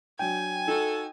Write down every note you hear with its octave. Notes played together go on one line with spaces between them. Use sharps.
F#3 D4 G5 G#5
D#4 F#4 A4